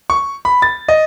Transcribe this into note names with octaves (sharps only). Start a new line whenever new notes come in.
C#6
B5
A6
D#5